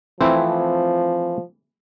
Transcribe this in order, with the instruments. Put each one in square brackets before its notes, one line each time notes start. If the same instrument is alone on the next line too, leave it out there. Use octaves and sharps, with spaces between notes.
[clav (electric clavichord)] E3 A3 E4 [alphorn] F3 [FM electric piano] C4